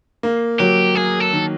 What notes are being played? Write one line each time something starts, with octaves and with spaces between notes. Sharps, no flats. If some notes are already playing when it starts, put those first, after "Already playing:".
A#3
F#3 G4
A#3 G#4
A4
D#3